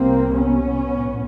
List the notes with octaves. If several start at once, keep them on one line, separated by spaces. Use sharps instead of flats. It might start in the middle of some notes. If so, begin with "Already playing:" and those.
Already playing: C2 C3 A#3 C4
B3 C#4
A#1 A2